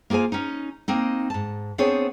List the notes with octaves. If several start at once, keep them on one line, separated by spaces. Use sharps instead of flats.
A#3 F4 G#4 C5 G#5
C#4 D#4
A#3 C4 D#4
G#2 A5
B3 C4 D4 G#4 C5 C#5